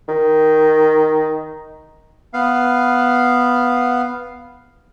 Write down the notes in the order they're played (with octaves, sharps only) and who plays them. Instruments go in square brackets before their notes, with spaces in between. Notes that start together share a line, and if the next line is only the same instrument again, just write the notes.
[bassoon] D#3
[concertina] B3 F5